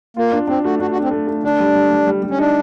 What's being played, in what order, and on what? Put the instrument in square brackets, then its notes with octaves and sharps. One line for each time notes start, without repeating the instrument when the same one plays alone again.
[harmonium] A#3 [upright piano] F4
[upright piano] D4
[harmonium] C4 [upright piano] D4
[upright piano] A3 [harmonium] F#4
[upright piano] D4 [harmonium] F#4
[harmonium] F#4
[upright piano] D4
[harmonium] C4
[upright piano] A3
A3
[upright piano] D3 [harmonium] D4
[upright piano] G3
G3
G3
G3
G3
[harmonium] C#4
[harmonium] D4 [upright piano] D#4